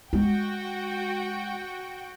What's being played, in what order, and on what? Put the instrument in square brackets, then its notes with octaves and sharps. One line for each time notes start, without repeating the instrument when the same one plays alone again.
[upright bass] G#3 [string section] F#4 G5